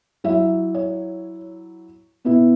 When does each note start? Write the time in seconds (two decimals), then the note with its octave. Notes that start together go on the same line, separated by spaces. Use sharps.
0.24 F#3 E4 E5
0.74 C#5
2.25 B2 B3 E4